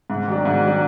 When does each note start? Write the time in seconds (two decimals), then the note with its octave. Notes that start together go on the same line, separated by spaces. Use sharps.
0.10 G#2
0.27 D#3 F#3 D4
0.45 G#2
0.63 D#3 F#3 D4